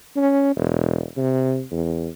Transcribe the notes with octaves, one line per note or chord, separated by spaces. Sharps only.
C#4
E1
C3
E2